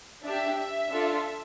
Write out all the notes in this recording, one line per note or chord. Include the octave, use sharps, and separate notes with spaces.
D4 G4 E5
E5
D4 F4 A4